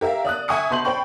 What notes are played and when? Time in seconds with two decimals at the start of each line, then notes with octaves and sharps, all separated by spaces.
0.01 G4 A#4 E5 F5
0.25 D5 D#6 F#6
0.48 E5 G#5 C#6 D#6 C#7
0.70 B2 B4 C6 G6 F#7
0.85 C5 D5 G5 B5 C#6 G6